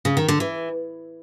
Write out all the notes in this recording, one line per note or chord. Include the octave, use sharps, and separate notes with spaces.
C#3
D#3
D3
E3